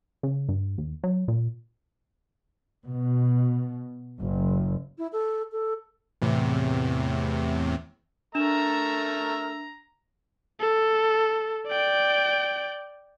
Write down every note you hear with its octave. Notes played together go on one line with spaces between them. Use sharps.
C#3
G2
D#2
F#3
A#2
B2
F#1
E4
A4
A4
E2 A2 C3
A3 D4 A#4 E5 A#5 E7
A4
D5 G5